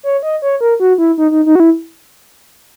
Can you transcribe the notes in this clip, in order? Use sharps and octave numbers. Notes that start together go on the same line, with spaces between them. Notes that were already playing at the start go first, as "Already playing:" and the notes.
C#5
D#5
C#5
A#4
F#4
E4
D#4
D#4
D#4
F#4
E4